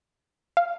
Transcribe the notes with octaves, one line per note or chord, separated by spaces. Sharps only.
F5